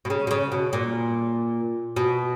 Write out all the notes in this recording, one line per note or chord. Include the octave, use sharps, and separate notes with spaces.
B2
C#3
B2
C#3
B2
A#2
B2